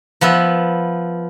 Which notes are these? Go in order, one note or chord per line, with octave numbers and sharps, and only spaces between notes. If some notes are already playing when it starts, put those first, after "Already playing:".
F3 B3 B4 E5